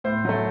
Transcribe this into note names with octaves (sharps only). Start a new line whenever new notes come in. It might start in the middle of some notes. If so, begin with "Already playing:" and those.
A2 C5
F#3 A3